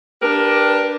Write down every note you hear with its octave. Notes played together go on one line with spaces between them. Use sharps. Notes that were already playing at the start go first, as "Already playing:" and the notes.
D4 G4 A#4 B4